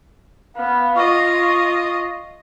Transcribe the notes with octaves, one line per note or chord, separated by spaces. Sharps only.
B3 F5
F4 D#5 C#6